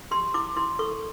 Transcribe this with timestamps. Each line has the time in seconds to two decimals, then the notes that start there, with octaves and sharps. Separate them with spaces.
0.11 G4 C6
0.34 E4 D6
0.56 E4 C6
0.79 A4 C#6